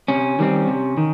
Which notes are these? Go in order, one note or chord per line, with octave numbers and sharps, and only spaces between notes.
C3 C#4
D#3 G3 C4
C3
D#3